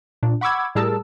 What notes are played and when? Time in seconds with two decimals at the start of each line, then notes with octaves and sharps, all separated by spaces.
0.23 A#2 D4
0.41 F#5 B5 C#6 D6 E6 G#6
0.75 A2 G3 G#4 A#4 A5 E6